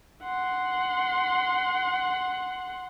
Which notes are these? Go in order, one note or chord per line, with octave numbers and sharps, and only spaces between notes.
F#5 C6